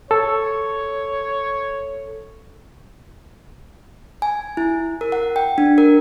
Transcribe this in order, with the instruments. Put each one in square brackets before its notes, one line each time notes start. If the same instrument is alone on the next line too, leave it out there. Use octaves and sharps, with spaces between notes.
[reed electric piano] A4 [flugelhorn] C#5
[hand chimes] G#5
E4
A#4
F#5
G5
D4
A#4